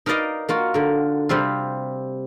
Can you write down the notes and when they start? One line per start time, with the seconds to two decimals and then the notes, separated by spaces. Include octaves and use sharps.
0.06 D#4 A#4 B4 D5 D#5 F5
0.49 A#3 F4 F#4
0.74 D3 A#4
1.29 C3 G3 C4 F4